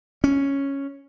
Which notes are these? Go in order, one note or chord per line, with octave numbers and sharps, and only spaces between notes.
C#4